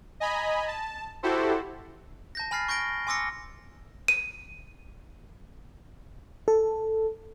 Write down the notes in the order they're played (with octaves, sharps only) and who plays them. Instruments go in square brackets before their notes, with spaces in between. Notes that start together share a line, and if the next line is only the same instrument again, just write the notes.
[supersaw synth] D#5 G#5 A#5 B5
A5
E4 F#4 G4 A4 C5
[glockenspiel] A5 G6 A#6
G#5 B5 F6 A6 C7
C#6 G6 A#6 D7 G7
G#5 C6 D6 E6 A#6 C#7
[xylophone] D#7
[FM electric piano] A4